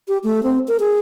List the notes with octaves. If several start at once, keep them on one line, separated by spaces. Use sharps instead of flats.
G4
A3
C4
A#4
G#4